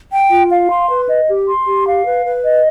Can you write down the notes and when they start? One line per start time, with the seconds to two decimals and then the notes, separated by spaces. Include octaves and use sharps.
0.11 G5
0.31 F4
0.51 F5
0.70 C6
0.89 B4
1.08 D#5
1.28 G4
1.47 C6
1.66 G4
1.86 F5
2.05 B4
2.25 B4
2.44 D#5